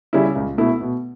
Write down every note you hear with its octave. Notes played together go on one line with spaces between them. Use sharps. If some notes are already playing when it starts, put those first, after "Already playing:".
C#3 G3 C#4 E4
C#2
B2 A3 E4
B2